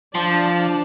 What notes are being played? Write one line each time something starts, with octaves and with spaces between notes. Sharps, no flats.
F3 D4 D5 A5